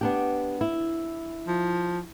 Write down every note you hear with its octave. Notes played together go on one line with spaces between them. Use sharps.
B3 D4 G4
E4
F3